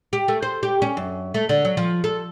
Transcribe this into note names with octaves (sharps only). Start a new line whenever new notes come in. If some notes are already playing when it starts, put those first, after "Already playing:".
G4
A3
C5
G4
C#4
F#2
A3
D3
F#3
F3
A4